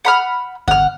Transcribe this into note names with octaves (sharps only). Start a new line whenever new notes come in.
F#5 B5 F6
G1 F#5 F6